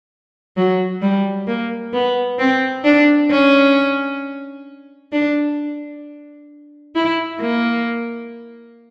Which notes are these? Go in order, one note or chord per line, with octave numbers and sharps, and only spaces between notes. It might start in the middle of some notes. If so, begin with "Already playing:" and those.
F#3
G3
A#3
B3
C4
D4
C#4
D4
E4
A#3